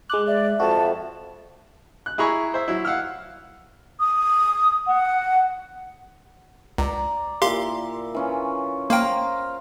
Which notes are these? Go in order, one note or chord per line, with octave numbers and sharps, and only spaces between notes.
G#3 D6 F#6
D5 E5
F2 F#4 A5
F#6
E4 G#4 A#5 B5 C#6
C5 E5
F#3 E4
F5 F#5 E6 F6
D#6
F#5
C#2 D5 A#5
A#2 E4 G4 F5 C6
E3 C#4 F4
A#3 C5 F5 G5 A#5